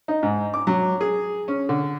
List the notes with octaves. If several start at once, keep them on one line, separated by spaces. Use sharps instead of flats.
D#4
G#2
D6
F#3
G#4
C#4
D3